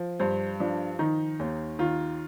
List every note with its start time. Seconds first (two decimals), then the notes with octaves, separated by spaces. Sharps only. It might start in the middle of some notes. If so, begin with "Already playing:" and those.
Already playing: F3
0.20 G2 C5
0.60 F3 D4
0.99 D#3 D#4
1.39 D#2
1.79 D#3 F4